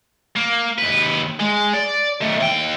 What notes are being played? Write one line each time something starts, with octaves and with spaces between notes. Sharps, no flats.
A#3
D#2 B4
G#3
D5
D#3 A3
D#2 G5